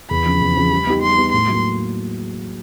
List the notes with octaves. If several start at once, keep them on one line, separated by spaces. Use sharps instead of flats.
E2 B5
C#3 F3
E2
C#3 F3
G3
B3 D#4 G4
G3 C6
B3 D#4 G4
A2 C6
F#3 A#3